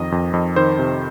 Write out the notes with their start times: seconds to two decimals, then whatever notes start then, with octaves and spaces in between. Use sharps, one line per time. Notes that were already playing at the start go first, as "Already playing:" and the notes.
Already playing: F2 D#3 D#5
0.12 F2
0.33 F2
0.56 D#3 C5
0.79 C3